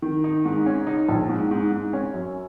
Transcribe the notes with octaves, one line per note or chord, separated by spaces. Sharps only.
D#3
D#4
G#2
C#4
D#4
A#1
G#2
G#2
G#2
C#4
F#2